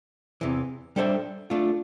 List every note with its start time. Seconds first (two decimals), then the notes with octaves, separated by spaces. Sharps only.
0.41 E2 C3 E3
0.96 G3 D4 A4 C5 E5
1.50 A3 D4 F4